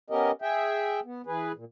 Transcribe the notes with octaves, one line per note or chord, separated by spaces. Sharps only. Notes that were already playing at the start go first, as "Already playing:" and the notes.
B3 C#4 G4 A#4 D#5
G#4 E5 G5
B3
E3 G#4 B4
A#2